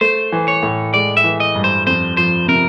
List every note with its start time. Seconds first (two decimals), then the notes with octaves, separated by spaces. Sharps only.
0.01 A3 C5
0.32 E3
0.48 C#5
0.63 A2
0.94 G#3 D5
1.17 E5
1.24 E3
1.40 D#5
1.55 G2
1.64 C5
1.87 F2 C5
2.17 F3 C5
2.48 C3 A#4